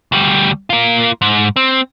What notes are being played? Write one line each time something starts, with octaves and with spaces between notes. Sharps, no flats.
D2 G3
A#3 F4
G#2
C4